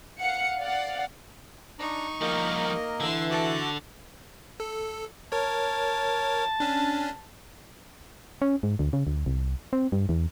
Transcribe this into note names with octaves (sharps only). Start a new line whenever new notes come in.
F5 F#5 C#7
D5 F5 F#5
D4 D#4 A#5 C#6
F3 G3 A#3 A#4 D#5
D3 E3 C6 E6
F#4 A4 A5 D6
A4
A#4 C#5 A5
C#4 D4
C#4
G#2
D2
C#3
D2
C2
C4
G2
E2